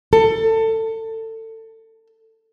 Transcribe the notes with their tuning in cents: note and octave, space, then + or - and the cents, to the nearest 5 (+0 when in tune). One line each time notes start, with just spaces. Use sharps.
A4 +25